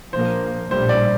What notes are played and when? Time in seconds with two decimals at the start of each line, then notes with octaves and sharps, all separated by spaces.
0.13 A#1 A#2 F3 A#3 C5
0.70 A#1 A2 G3 C5
0.89 D5